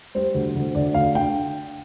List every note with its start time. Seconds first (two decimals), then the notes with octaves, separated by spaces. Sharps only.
0.15 G3 C5
0.35 D2
0.55 D2
0.75 D2 D5
0.94 D2 F5
1.15 D3 G5